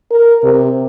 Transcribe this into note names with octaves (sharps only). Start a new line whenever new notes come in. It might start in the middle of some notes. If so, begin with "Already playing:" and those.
A#4
C3